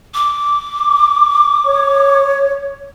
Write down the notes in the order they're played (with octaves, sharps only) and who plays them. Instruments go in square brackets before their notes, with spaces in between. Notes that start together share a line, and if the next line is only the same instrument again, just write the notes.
[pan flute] D6
[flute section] C#5